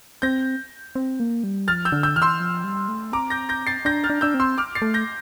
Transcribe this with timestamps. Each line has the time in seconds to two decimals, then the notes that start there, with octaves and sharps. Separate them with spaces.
0.22 C4 G6 A#6
0.95 C4
1.20 A#3
1.44 G3
1.68 F3 F6 A6
1.85 E6 G6
1.92 D3
2.03 E6 G6
2.16 E3 F6
2.22 C6 E6
2.40 F3
2.64 G3
2.88 A3
3.12 C4 A#5 D6
3.30 G6 A#6
3.49 G6 A#6
3.67 A6 C7
3.85 D4 G6 A#6
4.04 F6 A6
4.10 D4
4.21 D4 E6 G6
4.34 C4
4.40 C6 E6
4.58 D6 F6
4.75 A6 C7
4.82 A3
4.94 G6 A#6